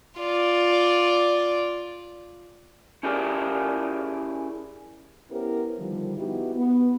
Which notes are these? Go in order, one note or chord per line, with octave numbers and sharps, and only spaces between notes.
F4 D5
C#4 E4 G4 G#4 A#4 D5
B3 C#4 E4 G4 A#4 C5
D3 D#3 F3 G3
B3 D#4 E4 F#4 G4
B3